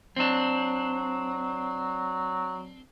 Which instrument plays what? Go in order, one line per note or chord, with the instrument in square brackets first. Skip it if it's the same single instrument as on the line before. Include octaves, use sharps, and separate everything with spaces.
[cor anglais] F#3 [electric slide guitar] C4 D4